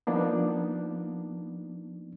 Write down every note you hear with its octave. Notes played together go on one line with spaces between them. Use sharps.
F3 A#3 B3 D4 D#4